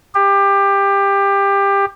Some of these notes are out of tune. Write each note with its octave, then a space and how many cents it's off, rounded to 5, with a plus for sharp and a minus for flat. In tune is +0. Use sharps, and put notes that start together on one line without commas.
G4 +20